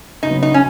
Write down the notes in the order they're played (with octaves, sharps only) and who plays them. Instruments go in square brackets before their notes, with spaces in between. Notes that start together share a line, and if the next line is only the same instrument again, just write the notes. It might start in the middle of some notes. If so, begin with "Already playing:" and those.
[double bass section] C#3 F#3 B3 [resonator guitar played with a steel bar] D#4
[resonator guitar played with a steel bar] D#4
C#4